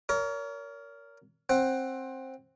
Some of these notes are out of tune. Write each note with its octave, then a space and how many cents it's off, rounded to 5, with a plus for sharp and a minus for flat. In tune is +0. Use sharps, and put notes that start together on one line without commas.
A#4 +0 C#5 +40
C4 +15 F#5 +10